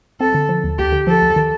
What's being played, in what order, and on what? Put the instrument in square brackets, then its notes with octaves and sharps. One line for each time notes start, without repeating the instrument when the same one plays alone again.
[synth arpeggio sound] C4 [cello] A4
[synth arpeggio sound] D3
F3
D#2
[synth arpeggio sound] D2 [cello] G4
[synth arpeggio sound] D3
[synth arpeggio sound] F3 [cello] A4
[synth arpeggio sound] D2
D#3